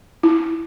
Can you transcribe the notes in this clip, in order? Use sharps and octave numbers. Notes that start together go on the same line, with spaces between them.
E4